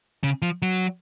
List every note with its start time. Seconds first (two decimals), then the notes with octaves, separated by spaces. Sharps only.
0.24 C#3
0.42 F3
0.62 F#3